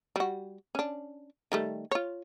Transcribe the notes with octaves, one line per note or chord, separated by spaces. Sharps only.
G3 F#4
C#4 D4
D#3 G3 A3
F4 C#5